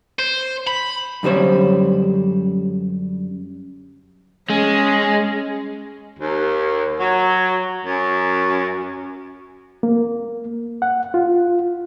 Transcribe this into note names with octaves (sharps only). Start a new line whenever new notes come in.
C5
B5
F#2 D3 G3 C5 C#5
G#3 C#4
D#2
F#3
F#2
A#3
F#5
F4